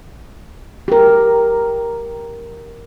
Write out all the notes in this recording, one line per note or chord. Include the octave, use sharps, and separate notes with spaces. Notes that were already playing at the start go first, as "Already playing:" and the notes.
G4 A#4